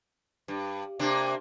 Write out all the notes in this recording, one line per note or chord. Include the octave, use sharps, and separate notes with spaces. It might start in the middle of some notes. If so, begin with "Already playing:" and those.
G2
C3 A#3 D4